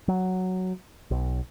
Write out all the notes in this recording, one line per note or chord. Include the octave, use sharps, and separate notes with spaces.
F#3
B1